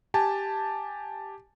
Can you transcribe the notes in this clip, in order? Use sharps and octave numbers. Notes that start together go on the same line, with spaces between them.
G4 G#5 A5